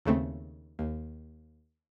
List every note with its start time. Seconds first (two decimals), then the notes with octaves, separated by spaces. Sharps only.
0.05 D#2 C#3 A3 C4
0.79 D#2